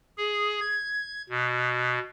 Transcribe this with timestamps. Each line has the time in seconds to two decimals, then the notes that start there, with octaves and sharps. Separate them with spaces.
0.17 G#4
0.61 G#6
1.29 B2